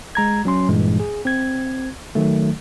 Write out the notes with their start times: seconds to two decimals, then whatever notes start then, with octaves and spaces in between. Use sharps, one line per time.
0.15 G#3 A#5 G#6
0.45 F#3 C#4 C6
0.69 G2 A#2 E3 G#3
1.00 G#4
1.25 C4 G#6
2.15 D#3 F#3 A3